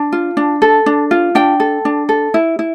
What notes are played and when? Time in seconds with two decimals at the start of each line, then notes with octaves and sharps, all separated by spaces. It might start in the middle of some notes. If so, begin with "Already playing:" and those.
Already playing: D4
0.12 F4
0.37 D4
0.62 A4
0.86 D4
1.11 F4
1.35 D4 G5
1.60 A4
1.85 D4
2.09 A4
2.34 E4
2.59 E4